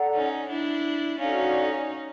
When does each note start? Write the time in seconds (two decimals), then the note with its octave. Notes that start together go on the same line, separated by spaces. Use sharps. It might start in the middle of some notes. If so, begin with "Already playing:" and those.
Already playing: A4 D5 F#5 A#5
0.14 C#4 D#4
0.50 D4 E4
1.20 C#4 D#4 F#4 A4 D5 F5